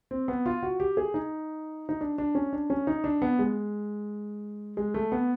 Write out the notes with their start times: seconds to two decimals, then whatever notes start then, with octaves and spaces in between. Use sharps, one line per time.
0.11 C4
0.28 B3
0.46 F4
0.63 F#4
0.80 G4
0.97 G#4
1.14 D#4
1.89 D#4
2.01 D4
2.18 D4
2.35 C#4
2.53 D4
2.70 C#4
2.87 D#4
3.04 D4
3.22 B3
3.39 G#3
4.77 G#3
4.94 A3
5.12 B3